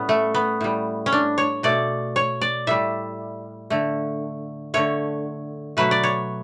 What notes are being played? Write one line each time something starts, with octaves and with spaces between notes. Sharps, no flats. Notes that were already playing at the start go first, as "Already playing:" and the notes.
Already playing: A2 G3 B3 C#4
A3
B3
A2 G3
C#4
D4
C#5
B2 A3 D5
C#5
D5
A2 G3 E5
D3 A3
D3 A3 C#5
B2 F#3 A3 B4
D5
C#5